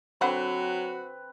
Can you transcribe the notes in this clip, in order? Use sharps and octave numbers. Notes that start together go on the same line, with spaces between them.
D3 F#3 C4 F#4 B4 F#5 B5